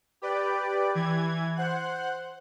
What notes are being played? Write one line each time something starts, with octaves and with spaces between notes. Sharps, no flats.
G4 B4 D5
E3 G#6
C5 F#5 F#6